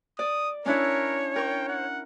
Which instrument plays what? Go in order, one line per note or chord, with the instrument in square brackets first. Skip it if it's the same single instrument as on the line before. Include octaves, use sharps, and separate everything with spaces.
[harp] D5 [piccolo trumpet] D#6
[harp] C#4 D4 E4 [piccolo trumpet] A#4 [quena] C#5
[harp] A#4 C#6 [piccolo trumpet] G5
[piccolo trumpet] F#5